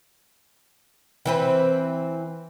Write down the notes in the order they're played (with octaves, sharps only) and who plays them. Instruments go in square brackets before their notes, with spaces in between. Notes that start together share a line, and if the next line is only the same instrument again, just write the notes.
[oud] E3 C4 B4